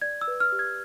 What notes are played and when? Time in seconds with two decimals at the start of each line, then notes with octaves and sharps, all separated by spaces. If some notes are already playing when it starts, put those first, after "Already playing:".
0.02 D5 G#6
0.21 E6
0.28 B4
0.40 F6
0.52 G4
0.59 G#6